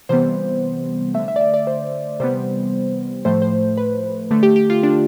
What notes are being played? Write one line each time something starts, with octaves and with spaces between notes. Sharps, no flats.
C3 E3 G3 B3 C5
D3 A3 E5
E5
D5
E5
D5
C5
C3 E3 G3 B3 C5
A2 F3 A3 C5
C5
B4
D3 A3
G4
G4
F4
D4